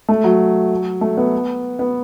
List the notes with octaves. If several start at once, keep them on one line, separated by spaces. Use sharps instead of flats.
A3
F#3
A3
B3
B3